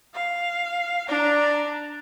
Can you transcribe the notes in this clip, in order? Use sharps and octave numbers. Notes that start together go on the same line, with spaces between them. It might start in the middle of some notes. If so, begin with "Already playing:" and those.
F5
D4 A#5